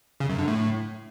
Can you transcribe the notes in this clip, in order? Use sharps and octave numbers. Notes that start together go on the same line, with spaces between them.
C#3
F#2
D3
A2